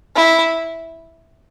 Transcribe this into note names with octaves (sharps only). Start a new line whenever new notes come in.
E4